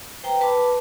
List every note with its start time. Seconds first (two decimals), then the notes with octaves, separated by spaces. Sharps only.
0.23 B4 C5 G5 A#5
0.41 B4 A5 B5 D6